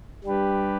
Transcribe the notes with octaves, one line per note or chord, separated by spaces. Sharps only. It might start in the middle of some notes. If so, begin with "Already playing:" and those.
G3 D4 G4 B4